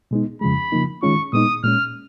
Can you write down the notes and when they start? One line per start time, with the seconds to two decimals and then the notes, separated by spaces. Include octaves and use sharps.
0.11 B2 G#3 B3 D#4
0.41 F2 C#3 F3 G#3 B5
0.72 C#3 F3 A#3 D#4
1.02 D#3 G#3 C#4 F4 C#6
1.33 A#2 G#3 B3 D#4 D#6
1.63 A#2 G#3 C#4 F6